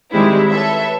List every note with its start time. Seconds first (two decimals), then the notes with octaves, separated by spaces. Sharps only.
0.12 D#3 G3 G#3 C4 E4
0.49 A4 B4 C#5 E5